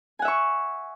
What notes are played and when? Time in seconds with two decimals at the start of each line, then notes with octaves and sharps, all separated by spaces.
0.19 G#5
0.22 F#5
0.25 E5
0.28 C#6